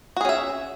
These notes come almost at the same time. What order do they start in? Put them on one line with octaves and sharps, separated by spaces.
F#4 G#4 C#4 E5